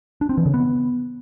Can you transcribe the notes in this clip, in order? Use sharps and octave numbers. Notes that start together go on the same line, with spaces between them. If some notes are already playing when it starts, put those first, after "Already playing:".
D4
C4
E3
C#3
B3